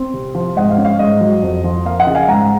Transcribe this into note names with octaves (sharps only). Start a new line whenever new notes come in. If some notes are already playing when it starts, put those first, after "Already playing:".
Already playing: C4
C3
F3
G#2 D#5 F#5
F5
C#4
F5
G#2 D#5
F#3
F2
F3
A#3 F5
D#5 F#5
C#3
F5 G#5
G#2 F#5 A#5